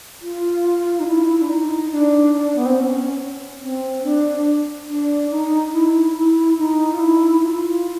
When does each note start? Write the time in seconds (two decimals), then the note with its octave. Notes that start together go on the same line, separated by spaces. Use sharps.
0.22 F4
1.00 D#4
1.07 E4
1.41 D4
1.49 D#4
1.92 D4
2.34 D4
2.56 B3
2.66 C4
2.76 C#4
3.61 C4
4.03 D4
4.88 D4
5.31 D#4
5.73 E4
6.15 E4
6.58 D#4
6.94 F4
7.00 E4
7.42 F4